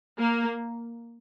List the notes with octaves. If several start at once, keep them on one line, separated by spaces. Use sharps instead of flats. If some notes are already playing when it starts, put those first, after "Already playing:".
A#3